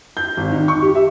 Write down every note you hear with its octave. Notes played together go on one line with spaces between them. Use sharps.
G6
G#1
D#3
C#6
G4
E5